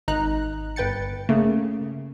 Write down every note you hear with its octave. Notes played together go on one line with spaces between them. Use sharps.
G#1 D#4 A#5 F#6
G1 B4 G5 A6 C#7
C#3 A3 A#3